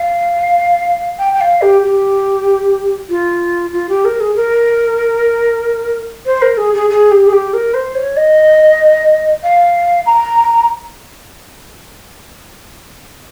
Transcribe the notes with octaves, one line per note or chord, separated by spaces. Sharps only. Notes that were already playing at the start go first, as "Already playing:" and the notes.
Already playing: F5
G5
G5
F5
G4
G4
F4
F4
G4
A#4
G#4
A#4
C5
A#4
G#4
G#4
G#4
G4
G#4
G4
A#4
C5
C#5
D#5
F5
A#5